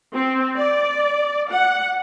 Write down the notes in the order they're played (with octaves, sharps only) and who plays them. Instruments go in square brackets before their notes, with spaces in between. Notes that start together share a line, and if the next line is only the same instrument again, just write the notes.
[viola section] C4
D5
F#5